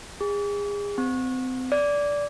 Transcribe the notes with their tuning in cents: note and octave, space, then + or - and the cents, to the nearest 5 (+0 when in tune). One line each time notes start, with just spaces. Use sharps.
G#4 -35
C4 -30
D5 -15